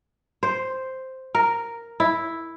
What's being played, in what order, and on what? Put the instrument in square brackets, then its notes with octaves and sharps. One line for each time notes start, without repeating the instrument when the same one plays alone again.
[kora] C5
A#4
E4